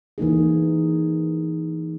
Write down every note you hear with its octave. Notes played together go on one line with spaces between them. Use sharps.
E3 A#3 D#4 G#4